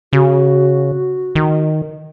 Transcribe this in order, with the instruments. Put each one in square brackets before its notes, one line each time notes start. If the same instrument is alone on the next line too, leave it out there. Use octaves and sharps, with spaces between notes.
[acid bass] C#3 [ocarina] F#4
[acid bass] D#3